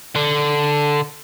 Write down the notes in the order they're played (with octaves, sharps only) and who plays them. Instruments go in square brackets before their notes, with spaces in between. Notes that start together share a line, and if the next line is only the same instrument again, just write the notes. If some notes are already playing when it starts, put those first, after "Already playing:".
[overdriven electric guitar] D3